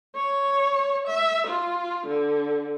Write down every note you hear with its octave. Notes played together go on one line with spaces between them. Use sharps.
C#5
E5
F4
D3